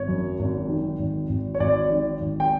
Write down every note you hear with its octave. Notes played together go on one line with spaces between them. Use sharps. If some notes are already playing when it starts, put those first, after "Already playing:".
Already playing: G#1 C#5
F#2
G#1
D#3
G#1
G#1
C#5
G#1 D5
D#3
G#1
G5